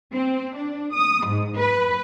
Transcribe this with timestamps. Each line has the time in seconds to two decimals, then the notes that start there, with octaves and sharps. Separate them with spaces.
0.13 C4
0.55 D4
0.94 D#6
1.26 G#2
1.57 B4